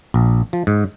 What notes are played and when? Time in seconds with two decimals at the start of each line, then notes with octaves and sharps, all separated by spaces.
0.14 A#1
0.53 F3
0.67 G#2